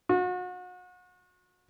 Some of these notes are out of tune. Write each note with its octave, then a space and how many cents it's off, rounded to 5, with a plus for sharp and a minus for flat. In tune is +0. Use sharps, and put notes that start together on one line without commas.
F#4 -35